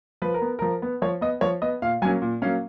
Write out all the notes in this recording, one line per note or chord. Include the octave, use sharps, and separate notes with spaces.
F3 B4
A#4
B3
F3 A#4
B3
F3 C#5
B3 D#5
F3 C#5
B3 D#5
A#2 F5
F#3 A#3 C#4 G#5
A#2
F#3 A#3 C#4 F5